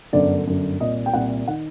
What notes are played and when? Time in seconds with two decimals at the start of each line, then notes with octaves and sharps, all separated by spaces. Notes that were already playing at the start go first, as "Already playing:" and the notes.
0.13 G1 F#2 D3 D5
0.46 G1 F#2 D3
0.80 C2 A#2 D#5
1.06 G5
1.13 C2 A#2 F#5
1.48 D#3 F#5